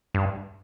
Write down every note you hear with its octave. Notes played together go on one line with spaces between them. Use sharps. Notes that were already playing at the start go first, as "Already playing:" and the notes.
G2